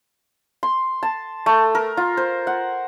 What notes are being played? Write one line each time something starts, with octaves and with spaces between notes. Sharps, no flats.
C6
A5
A3
A#4
F4
C5
F#5